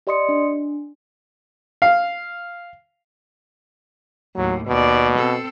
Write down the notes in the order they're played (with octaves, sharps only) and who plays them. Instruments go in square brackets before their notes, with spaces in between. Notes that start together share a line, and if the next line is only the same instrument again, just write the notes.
[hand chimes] G4 D5 D#5 C6 D#6 C#7
D4
[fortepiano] F5
[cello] D#2 A2 [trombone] F#3
[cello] D#2 D5 [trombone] B2
[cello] C4 A4